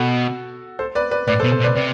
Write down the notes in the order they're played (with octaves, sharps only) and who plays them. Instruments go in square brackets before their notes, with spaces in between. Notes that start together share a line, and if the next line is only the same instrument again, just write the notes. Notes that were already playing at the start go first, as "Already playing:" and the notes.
Already playing: [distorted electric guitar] B2 [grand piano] F#4 A4
[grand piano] A4 C5
B4 D5
B4 D5
[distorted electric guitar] A2 [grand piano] B4 D5
[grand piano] A4 C5
[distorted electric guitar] B2
[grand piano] A4 C5
[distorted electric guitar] B2
[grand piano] B4 D5
[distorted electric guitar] C3 [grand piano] B4 D5